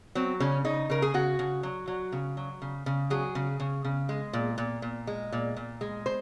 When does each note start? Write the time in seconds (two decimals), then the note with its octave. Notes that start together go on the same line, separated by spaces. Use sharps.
0.15 F#3 C4
0.40 C#3 C#4
0.65 C#3 D#4
0.90 C#3 A#4
1.02 G#4
1.14 C#3 F#4
1.39 C#3
1.63 F#3
1.88 F#3
2.12 C#3
2.37 F#3
2.62 C#3
2.86 C#3
3.10 F#3 G#4
3.35 C#3
3.60 C#3
3.85 C#3
4.09 G#3
4.33 A#2
4.58 A#2
4.82 A#2
5.07 G#3
5.32 A#2
5.57 A#2
5.81 G#3
6.06 C5